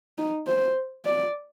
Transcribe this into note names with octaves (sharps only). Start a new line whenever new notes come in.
D#4
C5
D5